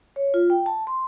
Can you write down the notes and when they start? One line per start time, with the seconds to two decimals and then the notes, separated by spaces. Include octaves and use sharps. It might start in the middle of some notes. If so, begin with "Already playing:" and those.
0.16 C#5
0.34 F4
0.50 G5
0.66 A5
0.87 C6